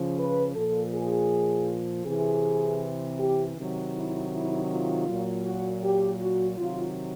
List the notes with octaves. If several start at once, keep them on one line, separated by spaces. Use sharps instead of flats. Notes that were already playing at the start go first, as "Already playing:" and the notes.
Already playing: C#3 F3
B4
A#2 F3 A4
G#4
C3 E3 G#4
G4
C3 D#3 F#3
E4
E4
F4
A#2 F#3
F#4
G4
F#4
C3 D#3 F#3 F4